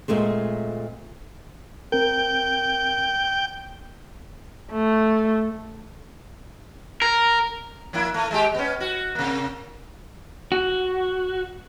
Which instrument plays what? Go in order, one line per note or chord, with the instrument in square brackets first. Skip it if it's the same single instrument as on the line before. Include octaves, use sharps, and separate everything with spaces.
[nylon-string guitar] A#2 G#3 A3 C4
[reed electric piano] C4 A#4 [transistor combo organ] G5
[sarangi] A3
[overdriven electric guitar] A#4
[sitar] F3 A#3 E4
A3
G#3 G4
B3 C#4
F#4
C3 A#3
[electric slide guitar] F#4